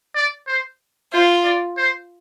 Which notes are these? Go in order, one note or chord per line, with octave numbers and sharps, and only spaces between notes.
D5
C5
F4 C5
D5
C5